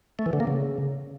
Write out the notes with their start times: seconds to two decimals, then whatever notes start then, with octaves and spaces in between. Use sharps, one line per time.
0.19 A3
0.26 E3
0.33 D3
0.40 A#3
0.47 C#3